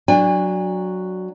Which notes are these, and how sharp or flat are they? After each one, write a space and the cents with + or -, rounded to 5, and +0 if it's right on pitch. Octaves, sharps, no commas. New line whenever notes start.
F#3 +0 D4 +0 G#5 -40